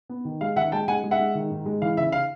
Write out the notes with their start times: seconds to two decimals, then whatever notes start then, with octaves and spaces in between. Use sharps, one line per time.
0.09 B3
0.25 D#3
0.41 G#3 F5
0.56 D#3 E5 F#5
0.72 G#3 G5 A5
0.88 G#3 F#5 G#5
1.04 G#3
1.11 E5 F#5
1.19 G#3
1.35 D#3
1.51 G#2
1.66 G#3
1.82 E3 F5
1.97 C#3 E5
2.12 F5